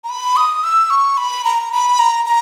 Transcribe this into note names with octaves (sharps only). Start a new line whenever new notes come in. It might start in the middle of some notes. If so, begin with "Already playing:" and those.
A#5
B5
D#6
E6
C#6
B5
A#5
B5
A#5
A#5